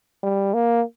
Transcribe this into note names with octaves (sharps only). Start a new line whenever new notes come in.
G3
A#3